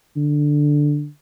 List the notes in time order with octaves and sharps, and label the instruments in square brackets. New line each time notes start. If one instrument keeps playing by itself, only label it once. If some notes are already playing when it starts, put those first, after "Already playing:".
[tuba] D3